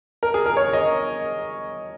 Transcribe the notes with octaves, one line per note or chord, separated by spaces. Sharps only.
A#4
G#4
A#4
C#5
D#5